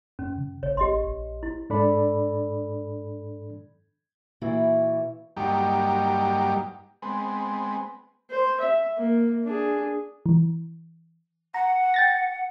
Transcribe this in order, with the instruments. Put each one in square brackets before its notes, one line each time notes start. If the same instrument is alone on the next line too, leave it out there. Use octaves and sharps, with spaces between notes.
[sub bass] F#2 [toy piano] C#4
[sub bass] C#3
[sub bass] A#1 [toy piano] C#5
[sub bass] A1 [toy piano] G4 D#5 C6
[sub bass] A#1
[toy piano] E4
[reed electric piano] G#2 D4 A4 D5 B5
[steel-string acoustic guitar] A#2 E3 A#3 E4 F#4
[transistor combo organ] G2 F#3 G3 A#3 D#4 G4
G#3 B3 C4
[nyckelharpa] C5
E5
A#3
D4 G#4
[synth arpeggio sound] E3
[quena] F#5 [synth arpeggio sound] A#5
[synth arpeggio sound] G5 A6 A#6